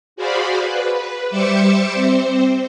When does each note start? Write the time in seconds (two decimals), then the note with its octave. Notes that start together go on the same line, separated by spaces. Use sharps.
0.16 F#4 G#4 C5 D5 F5 B5
0.60 B4
1.30 G3 C5 E5 D6 E6 C#7
1.94 C4 C5